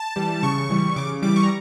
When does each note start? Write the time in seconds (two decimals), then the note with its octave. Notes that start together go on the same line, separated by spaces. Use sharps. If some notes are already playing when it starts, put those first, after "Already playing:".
Already playing: A5
0.16 E3 G3
0.43 C#3 C#6
0.70 E3 G3
0.96 C#3 D6
1.22 E3 G3 D6
1.36 C#6
1.43 A#5